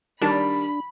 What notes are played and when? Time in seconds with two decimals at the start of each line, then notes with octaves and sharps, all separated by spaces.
0.22 D#3 G3 D4 A5 B5